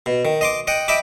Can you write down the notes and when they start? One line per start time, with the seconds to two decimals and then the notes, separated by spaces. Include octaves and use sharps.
0.06 B2
0.25 D#3
0.41 D#5 C6 D6
0.67 D#5 F#5 G5
0.88 D#5 E5 G5 B5 D6